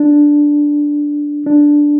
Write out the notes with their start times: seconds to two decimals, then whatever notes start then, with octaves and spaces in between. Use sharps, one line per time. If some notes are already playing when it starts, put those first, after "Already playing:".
Already playing: D4
1.46 D4